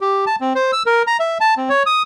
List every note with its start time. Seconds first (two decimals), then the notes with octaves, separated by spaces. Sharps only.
0.01 G4
0.26 A5
0.41 C4
0.55 C5
0.73 E6
0.86 A#4
1.07 A#5
1.20 E5
1.40 A5
1.57 C4
1.69 C#5
1.86 D#6